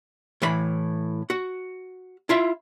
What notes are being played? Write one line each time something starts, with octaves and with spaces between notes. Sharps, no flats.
A2 E3 B5
F#4
E4 F4 E5